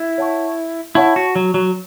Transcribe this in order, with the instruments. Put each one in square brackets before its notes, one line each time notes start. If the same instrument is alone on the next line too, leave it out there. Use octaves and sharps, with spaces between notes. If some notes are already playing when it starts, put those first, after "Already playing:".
Already playing: [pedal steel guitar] E4
[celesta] C#5 F#5 A5 C#6
[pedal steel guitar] E4 [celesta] C#5 F#5 A5 C#6
[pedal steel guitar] F#4
F#3
F#3